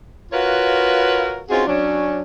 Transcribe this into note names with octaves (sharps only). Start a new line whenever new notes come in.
F4 F#4 A#4 B4 C#5 F5
C4 C#4 D#4 F4 F#4 G#4
F#3 C#4 D4